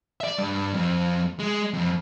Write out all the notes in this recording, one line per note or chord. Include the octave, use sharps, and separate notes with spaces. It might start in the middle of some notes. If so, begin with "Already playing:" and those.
D5 E5
G2
F2
G#3
F2